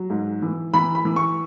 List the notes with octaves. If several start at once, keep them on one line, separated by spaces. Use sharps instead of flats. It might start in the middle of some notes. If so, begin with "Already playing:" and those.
Already playing: F#3
G#2
E3
E3 B5
B5
E3
C#6